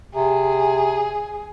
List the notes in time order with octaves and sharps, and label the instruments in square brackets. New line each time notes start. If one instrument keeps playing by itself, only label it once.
[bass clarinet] C3 [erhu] G#4